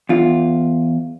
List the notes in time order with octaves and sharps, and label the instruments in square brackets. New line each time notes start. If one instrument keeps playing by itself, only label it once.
[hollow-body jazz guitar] E2 F4